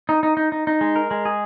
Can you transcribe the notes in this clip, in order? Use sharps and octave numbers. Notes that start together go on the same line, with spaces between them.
D#4
D#4
D#4
D#4
D#4
G#3
A#4
G#3
G#4